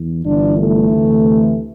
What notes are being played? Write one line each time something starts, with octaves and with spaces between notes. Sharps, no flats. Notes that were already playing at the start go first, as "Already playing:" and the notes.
Already playing: E2
G1 G2 E3 D4
A3
D2 C3 E3